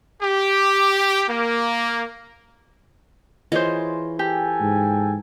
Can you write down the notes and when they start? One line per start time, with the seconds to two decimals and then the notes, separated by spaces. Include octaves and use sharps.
0.23 G4
1.29 A#3
3.52 E3 F4 G#4 C5 C#5 D#5
4.19 G4 A4 G5 G#5
4.61 G#2